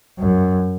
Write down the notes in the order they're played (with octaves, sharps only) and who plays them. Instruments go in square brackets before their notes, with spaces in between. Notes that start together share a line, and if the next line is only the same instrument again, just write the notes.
[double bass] F#2